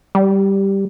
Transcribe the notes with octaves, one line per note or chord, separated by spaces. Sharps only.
G3